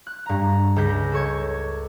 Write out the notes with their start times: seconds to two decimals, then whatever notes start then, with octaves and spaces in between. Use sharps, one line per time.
0.07 F#6
0.26 G2 A#5
0.76 C#2 C#4 G6 A#6 B6
1.12 A4 C#5 C#6 G#6